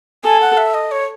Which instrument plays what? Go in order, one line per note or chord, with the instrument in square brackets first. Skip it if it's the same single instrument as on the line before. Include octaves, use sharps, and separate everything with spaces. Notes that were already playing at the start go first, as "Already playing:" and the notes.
[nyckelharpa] A4 [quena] G#5
[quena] F#5
E5
D#5
C#5